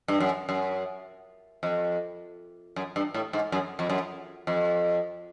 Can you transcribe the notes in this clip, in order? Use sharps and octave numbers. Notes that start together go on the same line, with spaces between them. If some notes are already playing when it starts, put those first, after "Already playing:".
G2
F#2
F#2
F2
F#2
G2
A2
G#2
F#2
F2
F#2
F2